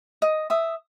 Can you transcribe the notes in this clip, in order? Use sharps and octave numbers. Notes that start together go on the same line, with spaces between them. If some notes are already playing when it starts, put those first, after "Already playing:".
D#5
E5 D#6